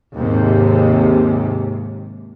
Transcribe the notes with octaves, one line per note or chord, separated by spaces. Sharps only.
D#2 G#2 C3